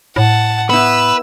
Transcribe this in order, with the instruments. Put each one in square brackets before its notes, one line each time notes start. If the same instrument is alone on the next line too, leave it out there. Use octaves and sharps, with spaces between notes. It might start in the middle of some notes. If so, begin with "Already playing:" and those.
[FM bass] A2 [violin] F#5 A5
[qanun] B3 E4 [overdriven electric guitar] B4 [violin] E6